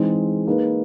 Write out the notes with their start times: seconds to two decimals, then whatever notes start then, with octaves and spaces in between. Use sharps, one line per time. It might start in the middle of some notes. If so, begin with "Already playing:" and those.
Already playing: E3 G#3 C4 D#4 G#4
0.47 A#3 D#4 G#4 B4